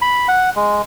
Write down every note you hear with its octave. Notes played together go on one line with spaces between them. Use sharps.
B5
F#5
G#3